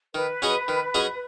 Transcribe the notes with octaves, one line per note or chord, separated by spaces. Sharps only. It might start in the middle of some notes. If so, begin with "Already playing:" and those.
D#3 B4
F#3 C#4 G#4 D#5
D#3
F#3 C#4 G#4 D#5